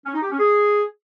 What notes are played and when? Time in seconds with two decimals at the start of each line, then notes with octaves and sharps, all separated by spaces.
0.06 C#4
0.14 D#4
0.23 G4
0.31 C#4
0.40 G#4